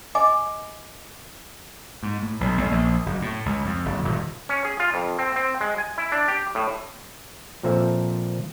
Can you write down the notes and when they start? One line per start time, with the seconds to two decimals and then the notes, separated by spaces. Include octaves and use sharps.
0.15 D#5 G#5 D6
2.03 G#2
2.23 A2
2.41 B1
2.57 B1
2.72 A#1
3.06 F#1
3.22 A2
3.46 C#2
3.65 F2
3.85 F#1
4.04 D#1
4.49 C#4
4.65 G#4
4.80 F4
4.94 F2
5.19 C4
5.36 C4
5.61 G#3
5.78 G#5
5.98 E4
6.12 D4
6.28 G4
6.55 A2
7.63 A#2 F3 C4 A4 E5